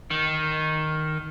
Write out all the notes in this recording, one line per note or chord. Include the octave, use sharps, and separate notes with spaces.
D#3